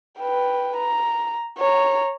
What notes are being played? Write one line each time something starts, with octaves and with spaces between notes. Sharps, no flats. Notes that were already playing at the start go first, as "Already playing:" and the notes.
B4 G5
A#5
C#5 A#5